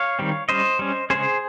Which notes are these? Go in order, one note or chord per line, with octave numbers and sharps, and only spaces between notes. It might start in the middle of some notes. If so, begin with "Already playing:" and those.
Already playing: C#5 F5
D#3 G3 C4
G3 C#4 C5 D#5
G3 C#4
C#3 G#3 C#4 G#4 C5